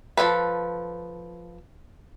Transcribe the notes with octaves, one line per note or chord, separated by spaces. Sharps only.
F3 G#3 A4 B4